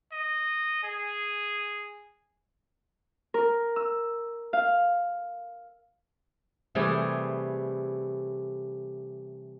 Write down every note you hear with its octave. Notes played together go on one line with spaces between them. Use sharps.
D#5
G#4
A#4
E6
F5
C3 E3 G3 A3 G#4